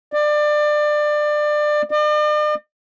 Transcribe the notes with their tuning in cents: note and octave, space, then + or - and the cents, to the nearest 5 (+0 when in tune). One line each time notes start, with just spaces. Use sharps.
D5 +25
D5 +45